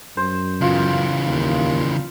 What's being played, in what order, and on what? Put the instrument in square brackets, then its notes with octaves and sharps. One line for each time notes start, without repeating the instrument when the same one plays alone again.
[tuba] F#2 [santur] C5
[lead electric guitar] C#3 E3 [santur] F4
[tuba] D#2